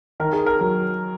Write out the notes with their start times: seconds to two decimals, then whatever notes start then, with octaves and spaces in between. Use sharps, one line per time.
0.20 D#3 A#4
0.33 G#4
0.46 A#4
0.61 F#3